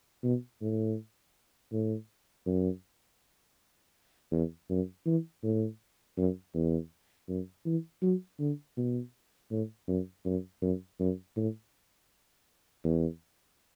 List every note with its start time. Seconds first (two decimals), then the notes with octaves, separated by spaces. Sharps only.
0.24 B2
0.61 A2
1.72 A2
2.46 F#2
4.32 E2
4.70 F#2
5.06 E3
5.43 A2
6.17 F#2
6.54 E2
7.28 F#2
7.65 E3
8.02 F#3
8.39 D3
8.77 B2
9.51 A2
9.88 F#2
10.25 F#2
10.62 F#2
11.00 F#2
11.36 A2
12.84 E2